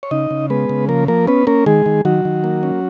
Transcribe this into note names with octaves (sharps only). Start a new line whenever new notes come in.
C#5
C#3 D#4 D#5
C#3
G#3 B3 B4
C#3
F3 A#3 A#4
F3 A#3 A#4
B3 C#4 B4
A#3 C#4 A#4
D#3 G#3 G#4
D#3
D#3 F#3 F#4
D#3
A#3
C#4